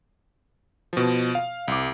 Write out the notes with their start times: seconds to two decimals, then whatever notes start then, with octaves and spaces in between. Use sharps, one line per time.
0.93 B2 F3
1.35 F5
1.68 C2 D6